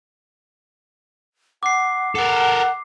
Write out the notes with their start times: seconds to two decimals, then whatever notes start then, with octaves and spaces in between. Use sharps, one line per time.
1.63 F#5 D6 C7
2.15 A4 A#4 F#5